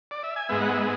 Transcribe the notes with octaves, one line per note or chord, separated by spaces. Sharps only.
D5
E5
G#5
G#2 G#3 B3 E5
F#5
E5